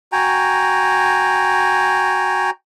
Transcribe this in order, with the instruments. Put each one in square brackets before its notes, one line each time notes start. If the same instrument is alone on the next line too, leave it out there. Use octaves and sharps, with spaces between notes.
[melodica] F#4 G5 G#5 A#5